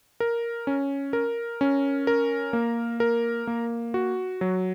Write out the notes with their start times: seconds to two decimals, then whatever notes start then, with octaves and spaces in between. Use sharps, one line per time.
0.20 A#4
0.67 C#4
1.13 A#4
1.61 C#4
2.07 A#4
2.53 A#3
3.00 A#4
3.47 A#3
3.94 F#4
4.41 F#3